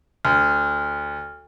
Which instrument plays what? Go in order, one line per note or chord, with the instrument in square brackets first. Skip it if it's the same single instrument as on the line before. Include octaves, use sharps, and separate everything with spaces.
[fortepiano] D2 [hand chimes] F6